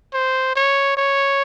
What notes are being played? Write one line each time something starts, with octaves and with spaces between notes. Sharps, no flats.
C5
C#5
C#5